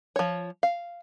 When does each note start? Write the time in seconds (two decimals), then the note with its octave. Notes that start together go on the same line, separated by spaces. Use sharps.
0.16 F3 C#5
0.63 F5